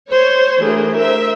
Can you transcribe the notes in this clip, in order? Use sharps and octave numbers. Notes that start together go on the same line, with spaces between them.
C5 C#5
E3 A3 D4 F#4 G#4 A#4
A#4 C5 E5